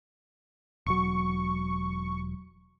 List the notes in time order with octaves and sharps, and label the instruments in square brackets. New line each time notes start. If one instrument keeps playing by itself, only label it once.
[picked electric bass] E1 F#3 [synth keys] C#6